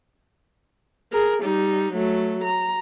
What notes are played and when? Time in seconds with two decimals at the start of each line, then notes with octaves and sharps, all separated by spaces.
1.13 G#4 A#4
1.43 G3 D#4
1.94 F#3 A3
2.44 A#5